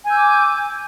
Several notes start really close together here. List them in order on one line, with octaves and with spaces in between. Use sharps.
G#5 G6 E6 D6